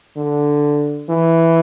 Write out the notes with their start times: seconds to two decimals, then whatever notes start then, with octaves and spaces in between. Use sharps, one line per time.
0.17 D3
1.09 E3